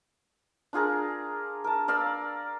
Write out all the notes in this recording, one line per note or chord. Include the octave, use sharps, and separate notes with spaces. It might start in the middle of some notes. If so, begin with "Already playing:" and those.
D4 F4 G#4 A#4
A#4 A5
A#4 D5 F5 E6